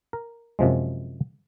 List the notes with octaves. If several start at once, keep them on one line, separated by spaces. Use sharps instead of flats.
A#4
F#2 C3 F3 G#3